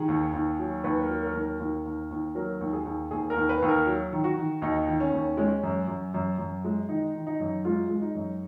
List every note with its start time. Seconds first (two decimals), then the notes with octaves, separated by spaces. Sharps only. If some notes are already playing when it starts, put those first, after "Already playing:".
Already playing: D#3 G#4
0.08 D#2
0.34 D#2
0.59 F#3
0.84 D#2 B4
1.03 A#4
1.10 F#3
1.23 A#4
1.34 D#2
1.41 A#4
1.60 D#2
1.86 D#2
2.11 D#2
2.35 F#3 A#4
2.61 D#2
2.73 G#4
2.85 D#2
3.11 D#2 G#4
3.30 A#4
3.36 D#2
3.49 B4
3.62 D#2
3.68 A#4
3.87 F#3
4.13 D#3
4.24 F#4
4.37 D#3
4.62 D#2 D#4
4.87 D#3
5.00 C#4
5.12 D#2
5.37 G#3 C#4
5.63 F#2
5.88 F#2
6.14 F#2
6.38 F#2
6.64 G#3
6.89 D#3 D#4
7.15 D#3
7.27 D#4
7.40 F#2
7.65 G#3 F4
7.89 G#3
8.02 D#4
8.15 F#2